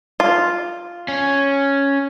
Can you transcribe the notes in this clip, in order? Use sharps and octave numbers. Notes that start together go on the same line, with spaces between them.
F4
C#4